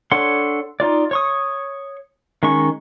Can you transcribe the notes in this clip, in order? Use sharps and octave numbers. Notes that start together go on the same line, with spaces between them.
D4 A4 C#5 F#5 C6
D#4 F4 D5
C#5 C#6 D#6
D#3 G#3 C#4 C#6